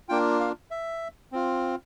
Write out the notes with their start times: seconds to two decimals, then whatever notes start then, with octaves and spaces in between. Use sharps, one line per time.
0.09 A#3 D4 F4 G5
0.40 F5
0.71 E5
1.32 C4 F4